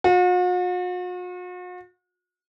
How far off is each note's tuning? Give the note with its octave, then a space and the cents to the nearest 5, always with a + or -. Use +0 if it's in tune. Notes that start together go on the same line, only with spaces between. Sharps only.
F#4 -45